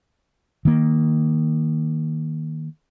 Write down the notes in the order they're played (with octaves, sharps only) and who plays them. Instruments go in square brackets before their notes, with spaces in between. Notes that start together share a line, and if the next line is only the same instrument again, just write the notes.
[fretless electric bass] D#3 A#3